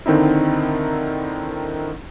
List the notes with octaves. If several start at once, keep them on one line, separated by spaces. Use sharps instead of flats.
D3 D#3 C4 D#4 E4